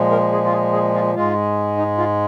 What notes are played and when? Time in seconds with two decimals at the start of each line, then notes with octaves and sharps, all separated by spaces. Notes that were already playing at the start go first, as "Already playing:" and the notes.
Already playing: A#2 F3 G#3
0.11 A#4
0.32 G#4
0.45 F4
0.52 G#4
0.73 G#4
0.94 F4
1.15 G#2 G#3 F4
1.77 D#4
1.98 F4